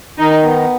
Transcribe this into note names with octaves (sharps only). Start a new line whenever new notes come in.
D#3 D#4
B3